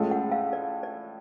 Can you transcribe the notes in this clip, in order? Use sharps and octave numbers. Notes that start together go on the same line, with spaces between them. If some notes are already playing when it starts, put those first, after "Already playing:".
Already playing: A2 G#3 C#4 F4 A4
F#5
F5
D5
D5